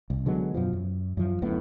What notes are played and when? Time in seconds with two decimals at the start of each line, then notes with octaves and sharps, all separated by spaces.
0.10 C2
0.26 D3 F#3 G#3 B3
0.54 F#2 B2 F3
0.73 F#2
1.17 F#2 F3
1.42 D1 F#2 A2 B3